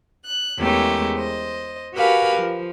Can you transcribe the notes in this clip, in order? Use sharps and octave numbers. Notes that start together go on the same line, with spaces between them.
F#6
E2 G#3 A3 C#4 G4 A#4
C5 D#5
F#4 G4 A#4 B4 F5 G#5
F3